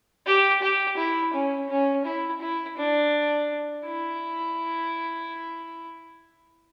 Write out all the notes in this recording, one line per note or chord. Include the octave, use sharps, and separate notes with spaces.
G4
G4
E4
C#4
C#4
E4
E4
D4
E4